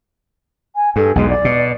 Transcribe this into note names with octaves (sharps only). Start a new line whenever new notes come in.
G#5
G2 A4
B1 E2 B2 G#3
D5
B2